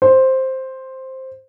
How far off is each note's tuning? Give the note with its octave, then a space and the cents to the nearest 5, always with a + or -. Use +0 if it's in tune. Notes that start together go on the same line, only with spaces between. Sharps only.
C5 +5